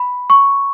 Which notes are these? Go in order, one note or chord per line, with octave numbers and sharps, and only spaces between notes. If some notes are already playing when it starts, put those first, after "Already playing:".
Already playing: B5
C#6